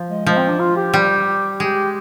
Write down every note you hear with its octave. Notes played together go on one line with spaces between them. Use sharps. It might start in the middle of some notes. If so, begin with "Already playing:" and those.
Already playing: F3
G#3
F3 G#3
C4
D4
F4
G4
G3
G#3 G4